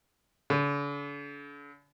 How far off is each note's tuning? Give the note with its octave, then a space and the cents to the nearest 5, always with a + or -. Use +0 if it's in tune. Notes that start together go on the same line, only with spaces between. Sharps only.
D3 -45